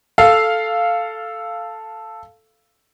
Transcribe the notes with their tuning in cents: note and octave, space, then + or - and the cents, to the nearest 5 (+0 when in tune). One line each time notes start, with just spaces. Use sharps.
A4 +0 F5 -5